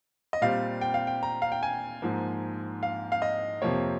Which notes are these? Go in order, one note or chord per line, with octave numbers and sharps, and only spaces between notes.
D#5
A#2 G3 C4 F5
G5
F5
G5
A#5
F5
G5
G#5
G#2 F3 A#3
F5
F5
D#5
F2 C3 F3 A#3 C#5